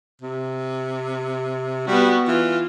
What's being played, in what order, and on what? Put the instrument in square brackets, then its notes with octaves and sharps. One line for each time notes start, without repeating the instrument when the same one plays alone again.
[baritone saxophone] C3
[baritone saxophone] G3 [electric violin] B3 F#4
[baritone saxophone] E3 [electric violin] F4